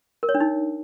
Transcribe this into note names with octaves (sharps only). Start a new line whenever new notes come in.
A#4
C#5
D4
D#4